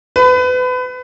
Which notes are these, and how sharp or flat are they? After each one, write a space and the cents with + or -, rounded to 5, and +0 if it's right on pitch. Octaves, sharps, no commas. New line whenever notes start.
B4 +30